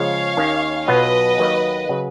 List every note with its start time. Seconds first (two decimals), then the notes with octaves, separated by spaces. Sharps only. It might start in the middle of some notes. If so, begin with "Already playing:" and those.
Already playing: C#3 F3 G#3 C#5 F5
0.37 D#2 D#3 A#3 C#4
0.87 B1 B2 F#3 B3 F4 B4 D#5
1.38 D#2 D#3 F#3 A#3
1.89 C#3 F#3 C#4